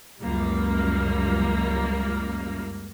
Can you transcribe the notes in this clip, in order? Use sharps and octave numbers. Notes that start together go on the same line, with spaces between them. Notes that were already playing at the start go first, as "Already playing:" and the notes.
C#2 F#2 G3 A#3